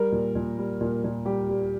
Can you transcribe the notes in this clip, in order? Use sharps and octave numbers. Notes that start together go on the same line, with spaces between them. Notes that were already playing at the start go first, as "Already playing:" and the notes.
Already playing: G3 A#4
A#2
A#2
G3
A#2
A#2
G3 G4
G3